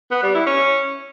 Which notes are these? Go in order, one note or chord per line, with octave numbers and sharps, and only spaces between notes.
B3
G3
E4
C#4